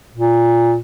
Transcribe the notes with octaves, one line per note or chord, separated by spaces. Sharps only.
A#2